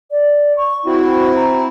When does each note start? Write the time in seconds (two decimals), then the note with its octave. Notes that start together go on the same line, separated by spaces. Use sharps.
0.11 D5
0.57 C#6
0.86 C4 E4 F#4
1.36 A#5